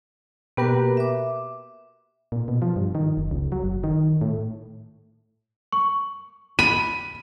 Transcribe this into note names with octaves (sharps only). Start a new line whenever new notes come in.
B2 A#3 G4 A#4 B4
E5 D6
A#2
B2
F3
G2
D#3
F#1
C#2
F#3
F#1
D#3
A2
C#6
B5 D#7